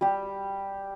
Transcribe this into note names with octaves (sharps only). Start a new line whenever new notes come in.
G3 G4